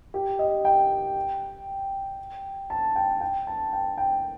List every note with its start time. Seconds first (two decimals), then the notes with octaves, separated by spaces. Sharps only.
0.14 G4
0.39 D#5
0.65 G5
2.70 A5
2.96 G5
3.21 G5
3.47 A5
3.73 G5
3.97 G5